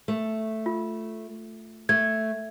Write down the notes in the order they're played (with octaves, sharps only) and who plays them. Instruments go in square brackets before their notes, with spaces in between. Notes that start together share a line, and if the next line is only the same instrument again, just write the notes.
[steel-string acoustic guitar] A3
[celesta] F4
[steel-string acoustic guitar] A3 [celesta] G#6